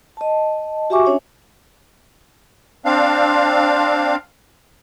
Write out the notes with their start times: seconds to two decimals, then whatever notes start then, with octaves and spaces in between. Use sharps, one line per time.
0.17 D#5 A5
0.90 F#4 G4 E5 G#5 C#6 D6
1.05 C#4 D4 C#5 E5 G#5
2.85 C4 D4 F5